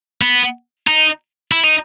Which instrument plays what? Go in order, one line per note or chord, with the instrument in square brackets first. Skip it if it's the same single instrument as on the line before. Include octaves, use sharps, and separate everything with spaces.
[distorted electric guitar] B3
D#4
E4
D#4